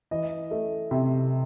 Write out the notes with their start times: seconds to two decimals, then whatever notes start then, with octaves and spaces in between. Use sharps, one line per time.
0.11 E3 D#5
0.51 A3
0.91 C3